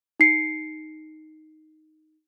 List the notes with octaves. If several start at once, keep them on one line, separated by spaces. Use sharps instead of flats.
D#4 C7 C#7